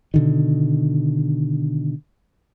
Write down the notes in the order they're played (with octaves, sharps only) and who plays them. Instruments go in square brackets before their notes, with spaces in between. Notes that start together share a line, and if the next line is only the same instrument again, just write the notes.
[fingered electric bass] B2 D3 D#3